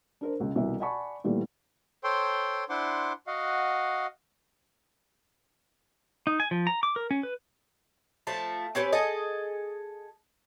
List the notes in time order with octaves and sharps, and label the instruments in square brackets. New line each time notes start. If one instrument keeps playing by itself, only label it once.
[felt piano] D4 A#4 C5
C#2 C#3
C2 B2 E3 E5
D5 F#5 G#5 A5 B5 C#6
A#2 D#3 E3 G3 A3 B3
[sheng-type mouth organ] A4 C5 C#5 G5 C6
D4 E4 C5 F#5 C6 D6
F#4 D#5 F5 F#5
[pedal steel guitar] D#4
G#5
F3
A#5
D6
A#4
C#4
B4
[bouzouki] F3 A3 A5
C4 C#4 G4 B4
G#4 A4 D#5